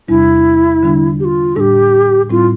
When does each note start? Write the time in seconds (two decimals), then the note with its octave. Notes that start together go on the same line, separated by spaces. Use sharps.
0.08 E2 C3 G3 D4 E4
0.83 D3 G3 D4
1.20 G4
1.25 F4
1.56 A2 G3 D4 G4 A4
2.30 A2 G3 C4 E4 F4